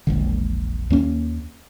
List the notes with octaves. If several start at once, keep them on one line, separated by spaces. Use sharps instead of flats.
E1 A#1 D3
D#2 A#3 C#4